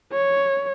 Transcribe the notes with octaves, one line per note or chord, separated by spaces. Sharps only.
C#5